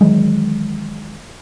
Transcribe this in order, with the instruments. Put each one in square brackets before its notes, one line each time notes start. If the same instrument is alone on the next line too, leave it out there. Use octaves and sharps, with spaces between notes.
[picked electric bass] D#3 E3 F#3 G#3